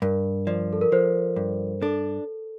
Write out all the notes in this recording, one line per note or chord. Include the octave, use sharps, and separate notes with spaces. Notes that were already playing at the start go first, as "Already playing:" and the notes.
G2 A#4
F3 D5
A4
A#4
F3 C5
G2
D4 A4